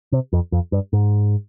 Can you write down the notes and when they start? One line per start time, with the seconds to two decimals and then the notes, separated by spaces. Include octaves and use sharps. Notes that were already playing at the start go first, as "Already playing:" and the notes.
0.12 C3
0.33 F2
0.52 F2
0.72 G2
0.93 G#2